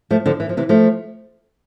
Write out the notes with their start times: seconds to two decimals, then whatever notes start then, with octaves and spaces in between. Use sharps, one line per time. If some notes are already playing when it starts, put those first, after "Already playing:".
0.11 F3 A3
0.26 D3 F3
0.40 E3
0.49 F3
0.57 C3 E3
0.69 F3 A3